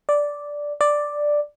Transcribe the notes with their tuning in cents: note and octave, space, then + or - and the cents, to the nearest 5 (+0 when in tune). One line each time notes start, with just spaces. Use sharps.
D5 -5
D5 +5